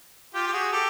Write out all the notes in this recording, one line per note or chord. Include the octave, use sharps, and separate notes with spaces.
F4 G4
G4
F#4 G#4
G4 A4